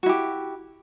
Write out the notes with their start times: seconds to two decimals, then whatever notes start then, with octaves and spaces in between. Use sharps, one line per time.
0.03 F#4
0.06 E4
0.09 G4